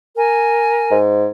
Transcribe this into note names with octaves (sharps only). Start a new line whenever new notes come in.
A#4 G#5
G#2